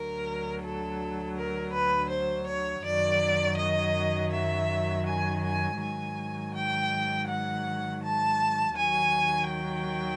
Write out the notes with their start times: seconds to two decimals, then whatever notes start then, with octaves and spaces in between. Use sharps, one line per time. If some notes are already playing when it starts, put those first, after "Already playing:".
Already playing: D2 D3 F#3 A#4
0.62 A4
1.36 A#4
1.72 B4
2.10 C5
2.47 C#5
2.84 F#2 D#3 F#3 D5
3.57 D#5
4.32 E5
5.06 G#5
5.43 G#5
5.80 G#2 D#3 F#3 G#5
6.54 G5
7.28 F#5
8.02 A5
8.76 D#2 D#3 F#3 G#5
9.50 G5